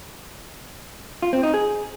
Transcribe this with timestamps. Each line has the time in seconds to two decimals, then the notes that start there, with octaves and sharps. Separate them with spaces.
1.22 F4
1.33 C4
1.43 D#4
1.54 G#4